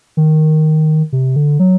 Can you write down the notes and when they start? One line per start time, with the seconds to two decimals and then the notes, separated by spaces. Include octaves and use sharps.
0.17 D#3
1.13 C3
1.36 D3
1.60 F#3